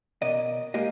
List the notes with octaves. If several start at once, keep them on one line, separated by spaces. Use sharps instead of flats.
B2 A#4 D5 D#5
G#3 A#3 G4 A#4 D#5